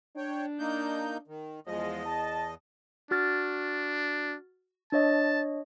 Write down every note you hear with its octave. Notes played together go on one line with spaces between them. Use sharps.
D4 C#5 G5
A#3 D#4 G6
D#3
E2 F3 G#3 D#5
A5
D4 F#4 F6 A6
D4 C#5 D#5 A5